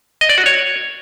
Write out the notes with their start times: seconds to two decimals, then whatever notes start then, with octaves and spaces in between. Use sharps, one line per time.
0.21 D#5
0.29 D5
0.38 F#4
0.46 C#5